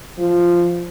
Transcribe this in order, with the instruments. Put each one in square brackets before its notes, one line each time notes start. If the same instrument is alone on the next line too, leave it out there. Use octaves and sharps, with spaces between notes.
[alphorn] F3